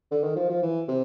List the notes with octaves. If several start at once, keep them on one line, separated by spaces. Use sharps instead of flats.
D3
D#3
F3
F3
E3
C3